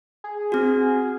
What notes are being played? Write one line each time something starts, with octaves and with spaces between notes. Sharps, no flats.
G#4
C4 F#4